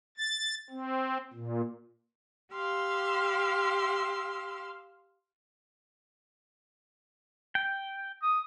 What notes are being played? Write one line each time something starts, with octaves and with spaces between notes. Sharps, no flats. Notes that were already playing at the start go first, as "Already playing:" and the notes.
A6
C4
A#2
G4 F5 C6 E6
G5
D#6